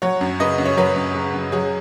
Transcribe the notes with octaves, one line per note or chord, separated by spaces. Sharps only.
F#3 C#5 F#5
F#2
C#3 B4 D#5
F#2
C#5
F#3 B4
F#2
C#3
F#2
F#3 G#4